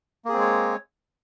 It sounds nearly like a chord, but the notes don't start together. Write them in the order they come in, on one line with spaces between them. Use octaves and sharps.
A#3 G#4 C4 G#3 C#5